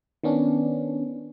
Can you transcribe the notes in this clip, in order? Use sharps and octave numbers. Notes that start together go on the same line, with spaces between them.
D#3 B3 C#4 D4